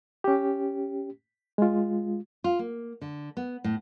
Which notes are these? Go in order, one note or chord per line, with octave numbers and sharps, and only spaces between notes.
C#4 G4
G#3 F4
F4
A#3
D3
B3
A2